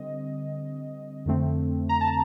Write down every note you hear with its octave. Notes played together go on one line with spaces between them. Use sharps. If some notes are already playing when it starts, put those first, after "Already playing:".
Already playing: D3 G3 C4 D#5
F2 D3 A3 C4
A#5
A5